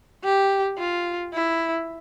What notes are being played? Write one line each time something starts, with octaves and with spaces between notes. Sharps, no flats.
G4
F4
E4